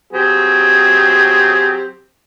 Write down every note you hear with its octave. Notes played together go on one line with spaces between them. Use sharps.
F#3 C4 G4 G#4